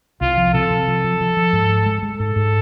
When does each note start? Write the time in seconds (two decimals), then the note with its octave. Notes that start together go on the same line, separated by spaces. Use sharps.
0.21 C2 F4
0.37 F3
0.54 C3 A4
0.70 C3
0.88 F3
1.04 F3
1.21 F3
1.37 F3
1.53 G#2
1.70 G#3
1.86 G#3
2.03 G#3
2.19 G#2 A4
2.36 G#2